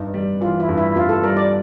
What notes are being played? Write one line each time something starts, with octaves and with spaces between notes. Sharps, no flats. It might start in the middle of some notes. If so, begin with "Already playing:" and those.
Already playing: G2 D#4
G3
E3 F4
E4
G2
E4
G2 F4
A4
G3 A#4
D5